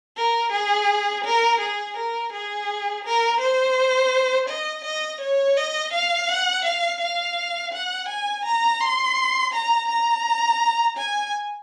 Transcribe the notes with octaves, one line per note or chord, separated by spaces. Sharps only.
A#4
G#4
A#4
G#4
A#4
G#4
A#4
C5
D#5
D#5
C#5
D#5
F5
F#5
F5
F5
F#5
G#5
A#5
C6
A#5
A#5
G#5